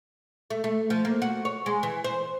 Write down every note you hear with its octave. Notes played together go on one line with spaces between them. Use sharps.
A3
A3
F3
A#3
F#4
C#5
G#3
E3
C5